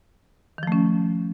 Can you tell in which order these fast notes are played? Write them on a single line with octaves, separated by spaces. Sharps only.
D#3 F3 A3 C#4